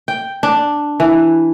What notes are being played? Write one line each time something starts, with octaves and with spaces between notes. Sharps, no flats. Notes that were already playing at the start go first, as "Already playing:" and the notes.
G5
D4
E3